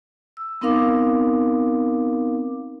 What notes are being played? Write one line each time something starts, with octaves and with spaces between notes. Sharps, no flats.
E6
B3 C4 D#4 A#4 F5 D6